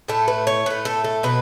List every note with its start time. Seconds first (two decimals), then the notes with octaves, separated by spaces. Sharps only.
0.08 A2 A3 A4
0.28 B4
0.47 C#5
0.66 A2 A3 B4
0.85 A4
1.04 A4
1.23 B2 F#3 A3 B4